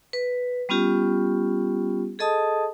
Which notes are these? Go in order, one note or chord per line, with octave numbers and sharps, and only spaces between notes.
B4
G3 B3 C#4 F4 G4
G#4 A4 D#5 A5 D#6